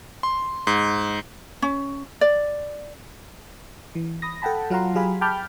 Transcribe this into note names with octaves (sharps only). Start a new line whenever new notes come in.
C6
G#2
C#4
D5
E3
B5 D#6 A#6
A4 F#5 G5 A5 B5
F#3 F4 F5 F#5 A#5 C6
F#3 G4 G#4 F5 G#5 B5
G5 A5 B5 D6 F6 G6